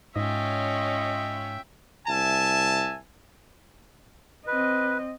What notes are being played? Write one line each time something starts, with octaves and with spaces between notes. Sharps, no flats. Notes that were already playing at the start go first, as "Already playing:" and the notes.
G#2 C#4 F4 C#5 D#5 E5 G5
C2 E5 G#5 A5
C4 B4 D#5